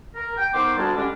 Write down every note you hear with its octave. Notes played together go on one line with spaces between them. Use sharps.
A#4
G5
D#3 B3 C5 D6
D2 G3 G#3 A5
D3 G3 G#3 C#4 D4